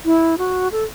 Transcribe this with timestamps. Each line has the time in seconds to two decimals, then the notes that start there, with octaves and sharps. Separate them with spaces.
0.05 E4
0.38 F#4
0.72 A4